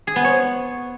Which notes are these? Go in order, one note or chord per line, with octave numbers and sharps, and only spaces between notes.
G#4
B3
C#5